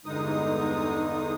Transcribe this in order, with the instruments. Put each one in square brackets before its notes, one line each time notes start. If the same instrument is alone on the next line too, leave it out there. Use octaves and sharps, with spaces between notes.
[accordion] E2 G2 D3 G#3 D#4 D#6